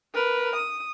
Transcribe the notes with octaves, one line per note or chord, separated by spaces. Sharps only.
A#4 B4
D#6